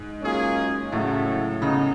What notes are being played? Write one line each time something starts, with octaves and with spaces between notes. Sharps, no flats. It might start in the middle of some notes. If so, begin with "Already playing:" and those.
Already playing: G#2
F#3 A#3 C#4 F4 G#4
A2 C#3 F#3 A3
C#3 B3 D#4